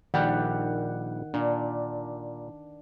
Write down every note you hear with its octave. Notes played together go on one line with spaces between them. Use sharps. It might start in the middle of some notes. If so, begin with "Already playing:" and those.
A#1 D#3 G3 G4 F#5
A#2 D4